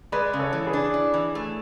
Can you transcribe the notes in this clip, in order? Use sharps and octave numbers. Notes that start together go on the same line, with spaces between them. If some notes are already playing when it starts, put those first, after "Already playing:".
G#3 B4 D5
C#3
A4 C#5
E3
G#4 B4
D4
E4
E3
A3